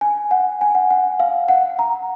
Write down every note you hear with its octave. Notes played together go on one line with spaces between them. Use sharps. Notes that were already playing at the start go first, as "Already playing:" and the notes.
G#5
F#5
G#5
F#5
F#5
F5
F#5
A#5